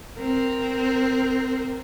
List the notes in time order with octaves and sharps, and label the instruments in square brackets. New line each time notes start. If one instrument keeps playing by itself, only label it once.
[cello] C4 A#4